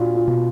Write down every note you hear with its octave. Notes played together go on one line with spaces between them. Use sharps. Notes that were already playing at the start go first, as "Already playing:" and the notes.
Already playing: A#2 D4 F4 F#4
F4
B2